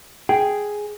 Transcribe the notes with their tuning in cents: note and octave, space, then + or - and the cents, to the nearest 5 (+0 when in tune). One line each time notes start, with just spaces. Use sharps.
G#4 +0 G5 +0